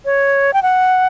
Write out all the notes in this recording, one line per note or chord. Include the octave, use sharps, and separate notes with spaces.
C#5
G5
F#5